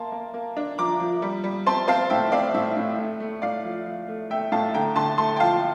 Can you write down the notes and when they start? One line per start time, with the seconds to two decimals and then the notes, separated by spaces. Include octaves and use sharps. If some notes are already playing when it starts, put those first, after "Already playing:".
Already playing: A#3 A5 C6
0.12 A#3
0.34 A#3
0.57 D4
0.78 F3 A#5 D6
1.00 F3
1.22 G3
1.44 G3
1.66 C4 A5 C6
1.88 C4 F5 A5
2.10 A2 E5 G5
2.32 C4 D5 F5
2.54 A2 E5
2.77 A2
2.98 A3
3.20 A3
3.42 A2 D5 F5
3.64 F3
3.86 F3
4.08 A3
4.30 A3 E5 G5
4.52 A2 F5 A5
4.74 D3 G5 A#5
4.96 D3 A5 C6
5.18 A3 A5 C6
5.36 G5
5.40 F3 F5 A5